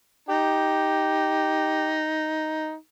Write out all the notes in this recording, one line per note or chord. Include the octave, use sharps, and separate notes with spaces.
D#4 G4